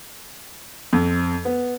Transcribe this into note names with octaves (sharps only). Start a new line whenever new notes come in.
F2
B3